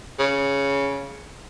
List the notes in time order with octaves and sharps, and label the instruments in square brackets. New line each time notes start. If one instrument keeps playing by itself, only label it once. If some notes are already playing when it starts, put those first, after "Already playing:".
[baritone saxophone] C#3